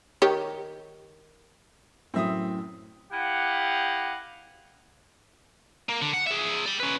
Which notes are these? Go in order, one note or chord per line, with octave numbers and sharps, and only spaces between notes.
D#3 G4 C#5
F#2 A2 C4 E5 D#6
E4 G4 D#5 F5 F#5
A#3
D3
F#5
G#4 E5
D5 G5
C#4 B4